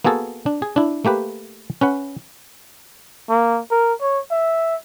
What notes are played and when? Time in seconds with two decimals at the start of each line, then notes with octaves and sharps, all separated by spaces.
0.04 A#3 B3 F#4 G#4 A4
0.46 D4
0.62 G#4
0.76 D4 E4
1.05 A3 A#3 G4 B4
1.81 C#4 B4 F#5
3.29 A#3
3.71 A#4
4.01 C#5
4.31 E5